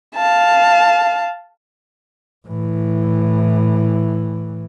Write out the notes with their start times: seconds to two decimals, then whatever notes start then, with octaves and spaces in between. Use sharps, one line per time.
0.15 F5 A5
2.47 A2 E3